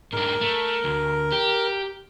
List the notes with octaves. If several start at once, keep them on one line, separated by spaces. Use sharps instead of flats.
G#2 D4 A#4
A3
D2
G4